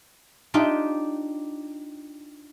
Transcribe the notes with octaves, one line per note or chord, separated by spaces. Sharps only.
D4 D#4 F4 G4